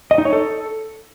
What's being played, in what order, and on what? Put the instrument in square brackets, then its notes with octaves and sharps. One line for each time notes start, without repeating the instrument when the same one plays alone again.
[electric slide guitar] D#5
D#4
C#5
A4